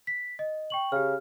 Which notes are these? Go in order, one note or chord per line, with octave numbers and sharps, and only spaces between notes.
B6
D#5
G5 C#6 F#7
C#3 G4 F6